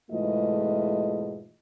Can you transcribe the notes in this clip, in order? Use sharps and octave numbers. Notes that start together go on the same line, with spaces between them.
E2 G#2 B2 A3 F4 D#5